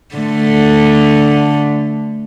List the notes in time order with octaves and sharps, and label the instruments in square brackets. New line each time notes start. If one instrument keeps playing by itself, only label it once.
[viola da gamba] D3 A3